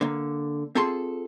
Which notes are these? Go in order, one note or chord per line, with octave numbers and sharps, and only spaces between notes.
D3 A#3
C4 F4 G#4 A4 A5 C6